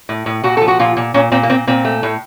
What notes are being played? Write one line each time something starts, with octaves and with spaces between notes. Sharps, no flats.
A2
A2
A#2 F#4
F3 A4
F#4
A#2 F4
A#2
A#2 C#4
A#2 C4
A#3
A#2 C4
A#2 C4
A3
A2